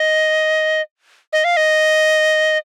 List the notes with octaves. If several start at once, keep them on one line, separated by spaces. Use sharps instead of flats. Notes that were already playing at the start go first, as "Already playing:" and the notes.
Already playing: D#5
D#5
F5
D#5